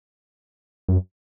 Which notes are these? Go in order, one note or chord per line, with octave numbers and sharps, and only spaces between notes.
F#2